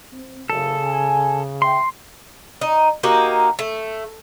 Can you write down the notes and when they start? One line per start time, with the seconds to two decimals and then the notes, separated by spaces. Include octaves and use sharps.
0.13 C4
0.50 F#1 C#3 A4
0.84 G#5
1.62 E5 G5 C6
2.61 D#4
3.03 A#3 D#4 F#4 G4
3.59 A3